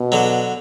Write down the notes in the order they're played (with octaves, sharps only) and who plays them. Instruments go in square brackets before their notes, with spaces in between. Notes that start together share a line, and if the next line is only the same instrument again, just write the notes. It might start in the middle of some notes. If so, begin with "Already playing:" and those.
Already playing: [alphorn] B2
[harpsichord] D3 F#3